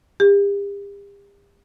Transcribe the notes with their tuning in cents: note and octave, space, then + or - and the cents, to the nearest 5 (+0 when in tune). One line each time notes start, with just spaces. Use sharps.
G4 +40